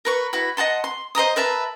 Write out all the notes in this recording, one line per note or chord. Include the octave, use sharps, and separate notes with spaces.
A#4 B4 C#6
E4 F#4 B4
D#5 F#5 A5 C6
C6
C5 D#5 A#5 D#6
A#4 B4 E5 A5